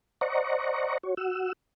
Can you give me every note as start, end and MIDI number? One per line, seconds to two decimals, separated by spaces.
0.21 0.98 72
0.21 0.98 74
0.21 0.98 75
0.21 0.98 78
0.21 0.98 82
0.21 0.98 85
1.03 1.14 66
1.03 1.14 73
1.17 1.53 66
1.17 1.53 78
1.17 1.53 88